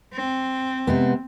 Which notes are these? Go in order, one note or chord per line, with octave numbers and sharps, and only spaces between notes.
C4
C3 G#3 B3